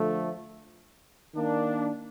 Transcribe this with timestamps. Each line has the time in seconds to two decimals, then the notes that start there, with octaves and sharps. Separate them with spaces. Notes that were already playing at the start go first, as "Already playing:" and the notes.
Already playing: D3 F3 A3
1.34 D#3 A#3 D4